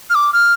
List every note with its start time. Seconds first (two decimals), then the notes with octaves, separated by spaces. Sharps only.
0.10 F6
0.15 D6
0.33 F6